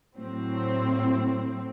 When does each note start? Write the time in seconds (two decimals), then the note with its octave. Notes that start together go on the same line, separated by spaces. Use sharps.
0.16 A2 F#3 C4